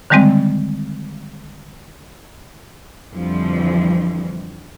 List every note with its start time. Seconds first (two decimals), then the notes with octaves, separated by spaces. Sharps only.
0.10 D3 D#3 G3 G#3 C4
3.13 F2 D3 E3 F3 G3